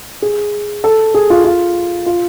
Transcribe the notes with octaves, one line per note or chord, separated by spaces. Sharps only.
G#4
A4
G#4
F4
F4
F4